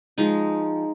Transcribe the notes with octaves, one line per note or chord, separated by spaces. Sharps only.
F3 G#3 D#4